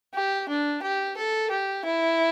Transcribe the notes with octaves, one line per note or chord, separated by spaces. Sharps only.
G4
D4
G4
A4
G4
E4